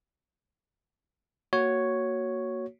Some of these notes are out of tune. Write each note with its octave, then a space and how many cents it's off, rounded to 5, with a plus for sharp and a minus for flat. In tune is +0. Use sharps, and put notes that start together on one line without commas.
A#3 +0 F#4 +0 C#5 +0